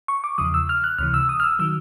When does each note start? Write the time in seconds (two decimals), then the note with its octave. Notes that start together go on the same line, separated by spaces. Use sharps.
0.08 C#6
0.24 D6
0.38 E2 C#3 F3 D#6
0.54 E6
0.69 F6
0.84 F#6
0.98 C#2 C3 E3 F6
1.14 E6
1.29 D#6
1.40 F6
1.44 E6
1.59 D#3 F#3 E6